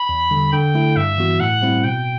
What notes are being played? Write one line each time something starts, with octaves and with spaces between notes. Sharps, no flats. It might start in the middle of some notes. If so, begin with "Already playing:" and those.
Already playing: B5
E2
D3 G3
D3 G5
A3 E4 A4
G2 E5
E3 B3 F#4
A2 F#5
G3 C4 E4
B2 G5